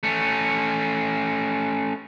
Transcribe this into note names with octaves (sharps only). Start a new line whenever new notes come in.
A3 C#4